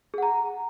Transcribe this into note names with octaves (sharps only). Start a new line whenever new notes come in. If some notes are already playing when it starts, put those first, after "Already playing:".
G#4 F#5 A#5